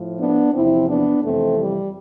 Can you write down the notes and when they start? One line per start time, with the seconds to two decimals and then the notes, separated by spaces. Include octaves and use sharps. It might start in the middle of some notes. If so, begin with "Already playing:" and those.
Already playing: A2 F3
0.20 B3 D4
0.54 E2 C3 F3 C4 E4
0.89 B3 D4
1.24 F2 C3 E3 A3 C4
1.59 G3